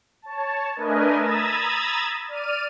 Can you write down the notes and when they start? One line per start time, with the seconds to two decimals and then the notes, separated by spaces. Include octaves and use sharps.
0.22 C#5 A5
0.75 A3 D4 A#4 B4 D#5 G#5
1.17 A#5 B5 D#6 E6 G#6 A6
2.28 D5 F6 D#7